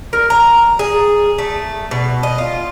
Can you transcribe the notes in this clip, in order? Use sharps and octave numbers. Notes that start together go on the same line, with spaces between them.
A#4
A#5
G#4
A3
B2
D#5
F4